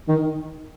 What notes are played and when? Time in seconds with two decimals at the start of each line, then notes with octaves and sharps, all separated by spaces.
0.08 D#3